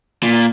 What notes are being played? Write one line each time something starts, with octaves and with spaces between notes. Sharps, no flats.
A#2